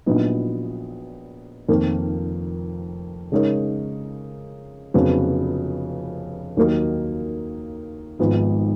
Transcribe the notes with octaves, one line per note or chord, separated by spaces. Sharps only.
A#1 A#2 F#3 B3 D#4
F1 F2 D#3 A#3
C#3 G#3 D#4 A#4 C#5
F1 F2 C#3 F#3 B3
D#2 D#3 F#3 A#3 D#4
G#1 G#2 F3 B3 D#4